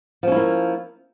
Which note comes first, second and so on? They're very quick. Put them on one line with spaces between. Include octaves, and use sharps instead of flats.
F3 C#4 E4 A#3